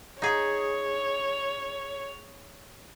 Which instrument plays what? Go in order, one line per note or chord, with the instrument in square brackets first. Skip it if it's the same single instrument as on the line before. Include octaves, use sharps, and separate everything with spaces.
[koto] D#4 G#4 [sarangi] C#5